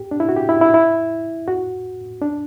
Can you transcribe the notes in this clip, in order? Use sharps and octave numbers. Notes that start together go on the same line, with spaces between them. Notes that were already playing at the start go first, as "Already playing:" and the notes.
Already playing: G4
D4
E4
F#4
G4
E4
E4
E4
F#4
D4